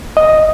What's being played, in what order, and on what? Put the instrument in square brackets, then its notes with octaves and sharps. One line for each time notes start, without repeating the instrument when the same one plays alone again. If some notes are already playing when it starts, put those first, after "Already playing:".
[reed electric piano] D#5